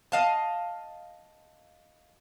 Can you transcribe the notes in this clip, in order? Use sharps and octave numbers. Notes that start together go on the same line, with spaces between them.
D#5 F5 A5